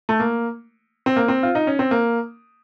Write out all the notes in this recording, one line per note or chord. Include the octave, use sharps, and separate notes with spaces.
A3
A#3
C4
A#3
C4
F4
D#4
C#4
C4
A#3